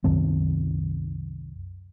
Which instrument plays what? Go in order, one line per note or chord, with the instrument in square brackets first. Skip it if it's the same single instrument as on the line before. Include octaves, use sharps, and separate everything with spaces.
[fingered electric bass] C2 F#2 D#3 C4